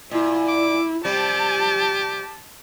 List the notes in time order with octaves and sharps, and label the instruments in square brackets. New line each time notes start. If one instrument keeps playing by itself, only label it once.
[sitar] A#2 [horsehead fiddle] E4
[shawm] D6
[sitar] C3 G3 [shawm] G4 [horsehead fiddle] A5